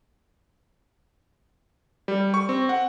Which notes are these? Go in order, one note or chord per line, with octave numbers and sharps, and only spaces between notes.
G3
C#6
C4
F#5